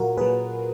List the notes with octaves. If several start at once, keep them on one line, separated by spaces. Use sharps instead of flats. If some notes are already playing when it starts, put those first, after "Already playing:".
Already playing: A#2 F#3 F4 F#4 A#4
A#2 F#3 G#4 B4